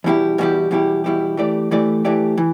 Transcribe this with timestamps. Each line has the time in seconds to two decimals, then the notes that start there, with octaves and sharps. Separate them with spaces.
0.04 E2 B2 G3 E4 G4
0.38 E2 B2 G3 E4 G4
0.71 E2 B2 G3 E4 G4
1.04 E2 B2 G3 E4 G4
1.37 E3 A3 G4 D5
1.71 E3 A3 G4 D5
2.05 E3 A3 G4 D5
2.38 E3